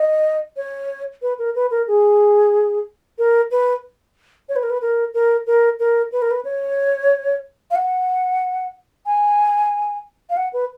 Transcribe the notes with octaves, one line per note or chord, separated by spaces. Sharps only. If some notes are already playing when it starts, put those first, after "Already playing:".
Already playing: D#5
C#5
B4
A#4
B4
A#4
G#4
A#4
B4
C#5
B4
A#4
B4
A#4
A#4
A#4
A#4
B4
A#4
B4
C#5
F5
F#5
G#5
F5
F#5
B4